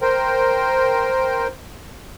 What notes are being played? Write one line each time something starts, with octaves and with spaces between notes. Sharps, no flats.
A#4 C5 G5